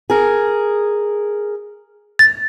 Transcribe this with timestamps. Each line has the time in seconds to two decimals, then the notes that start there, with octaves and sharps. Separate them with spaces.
0.10 G#4 A#4
2.19 A6